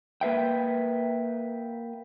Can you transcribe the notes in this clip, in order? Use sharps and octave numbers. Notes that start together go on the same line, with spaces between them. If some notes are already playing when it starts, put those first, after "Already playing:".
A#3 B4 E5 G5